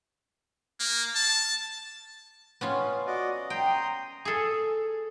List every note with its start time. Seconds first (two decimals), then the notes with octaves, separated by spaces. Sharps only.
0.80 A#3
1.15 A5
2.61 B3 C#4 F4
3.07 F#4 D5 D#5
3.31 D#5
3.50 G5 A#5 C6 D#6
4.25 G#4 A4